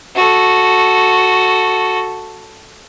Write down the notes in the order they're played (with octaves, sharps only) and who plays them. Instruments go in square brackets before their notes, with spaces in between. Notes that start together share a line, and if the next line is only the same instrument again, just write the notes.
[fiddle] F#4 A4